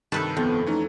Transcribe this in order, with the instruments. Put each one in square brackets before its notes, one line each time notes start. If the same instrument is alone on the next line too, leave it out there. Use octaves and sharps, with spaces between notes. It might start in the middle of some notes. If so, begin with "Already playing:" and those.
[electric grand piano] G2 C3 D#3 [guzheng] A4 B4 A5
[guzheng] F2 [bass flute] B3
[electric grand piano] E3 A3 C#4 [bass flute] D#4